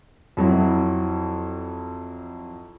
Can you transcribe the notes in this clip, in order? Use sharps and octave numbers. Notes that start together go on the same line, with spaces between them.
F2 F#3 E4